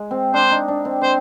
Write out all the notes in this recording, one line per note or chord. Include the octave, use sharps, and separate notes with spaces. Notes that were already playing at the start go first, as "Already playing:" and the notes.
Already playing: G#3
C4
D4 C5
D#4
D4
C4
C4 C5